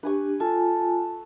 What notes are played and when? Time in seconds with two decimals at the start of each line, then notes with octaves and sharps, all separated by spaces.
0.03 D4 G4 B4 G#5 C#6
0.40 F4 A4 G#5